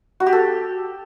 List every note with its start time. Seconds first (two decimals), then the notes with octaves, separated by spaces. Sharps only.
0.20 F#4
0.26 G4
0.33 A4